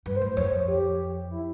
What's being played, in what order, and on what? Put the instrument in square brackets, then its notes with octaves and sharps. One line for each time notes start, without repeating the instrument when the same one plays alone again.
[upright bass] G2 [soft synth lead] B4
[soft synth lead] C5
[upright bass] A2
[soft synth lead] C5
[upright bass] F2 [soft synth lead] C#5
[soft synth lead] C#5
G4
E4